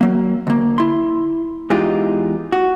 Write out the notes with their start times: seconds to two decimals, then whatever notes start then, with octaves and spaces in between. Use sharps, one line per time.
0.01 F#3 A#3
0.47 D2 A#3
0.78 E4 C6
1.70 E2 E3 G#3 D#4 F4 G4
2.52 F#4